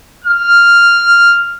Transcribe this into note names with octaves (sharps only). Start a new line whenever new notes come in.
F6